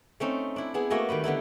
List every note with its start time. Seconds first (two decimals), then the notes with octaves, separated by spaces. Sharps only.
0.20 A3 C4 C#4 D#4
0.56 D4 E4
0.74 B3 E4 G#4
0.90 A3 A#3 F#4 D#5 E5 G#5
1.09 D#3 G3 B4 B5
1.24 D3 B3 D#4 E4